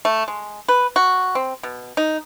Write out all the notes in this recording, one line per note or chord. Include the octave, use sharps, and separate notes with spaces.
A3
G#3
B4
F#4
C4
B2
D#4